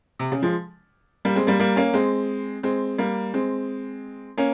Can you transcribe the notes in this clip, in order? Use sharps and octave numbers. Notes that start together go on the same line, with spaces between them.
C3
C#3
F3 G#3
G3 A#3
G#3 C4
G3 A#3
G3 A#3
A#3 C#4
G#3 C4
G#3 C4
G3 A#3
G#3 C4
A#3 C#4